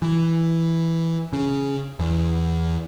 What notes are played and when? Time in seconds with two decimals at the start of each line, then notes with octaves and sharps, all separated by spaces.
0.02 E3
1.33 C#3
1.99 E2